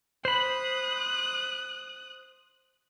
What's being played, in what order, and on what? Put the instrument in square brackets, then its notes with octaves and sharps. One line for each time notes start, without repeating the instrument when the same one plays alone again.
[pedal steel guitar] C5 B5 [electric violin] D#6 F#6